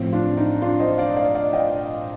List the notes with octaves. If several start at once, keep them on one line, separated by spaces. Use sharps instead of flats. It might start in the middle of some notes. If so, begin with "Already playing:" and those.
Already playing: A2 F3 C4
D4 F4
D#4
D4 F4
C5 D#5
D5 F5
D5 F5
D5 F5
D#5 G5